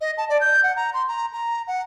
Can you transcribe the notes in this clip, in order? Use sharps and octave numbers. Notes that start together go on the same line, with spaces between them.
D#5
A5
D5
G6
F#5
A#5
C6
A#5
A#5
F#5